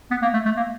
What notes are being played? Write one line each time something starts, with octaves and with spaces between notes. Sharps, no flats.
B3
A#3
A3
A3
A#3